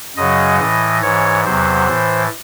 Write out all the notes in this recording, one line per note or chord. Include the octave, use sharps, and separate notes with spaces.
F#2 C#3 F#3 D#5
A2 E3 D#5
G#2 E3 C#5
E2 C3 F#3 C5
A2 E3